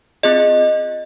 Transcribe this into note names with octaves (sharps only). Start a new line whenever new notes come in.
C4 F4 G#4 D#5